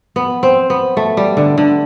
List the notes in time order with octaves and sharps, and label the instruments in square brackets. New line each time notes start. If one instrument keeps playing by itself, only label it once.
[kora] B3
C4
B3
A3
G3
D3
D3